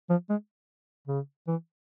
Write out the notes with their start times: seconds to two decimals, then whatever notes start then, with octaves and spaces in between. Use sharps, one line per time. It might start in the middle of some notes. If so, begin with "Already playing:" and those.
0.10 F3
0.30 G#3
1.08 C#3
1.47 E3